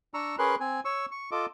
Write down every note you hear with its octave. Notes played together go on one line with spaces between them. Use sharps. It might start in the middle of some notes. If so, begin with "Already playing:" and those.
D4 A#5 C#6 E6
C#4 G#4 A#4 B4 C6 F#6
C4 G#5
C#5 C#6 E6
C#6
F4 A4 D#5 D6